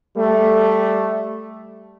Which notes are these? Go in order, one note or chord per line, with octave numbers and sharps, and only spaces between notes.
G3 A3